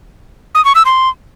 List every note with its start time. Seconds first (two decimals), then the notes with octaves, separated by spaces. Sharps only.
0.55 D#6
0.65 C#6
0.75 E6
0.85 C6